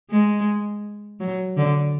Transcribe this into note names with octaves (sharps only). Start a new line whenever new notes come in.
G#3
F#3
D3